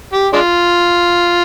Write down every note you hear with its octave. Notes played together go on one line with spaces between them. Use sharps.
G4
G#3 D4 F4